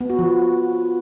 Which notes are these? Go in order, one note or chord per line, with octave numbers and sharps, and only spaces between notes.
B3
F#4
F3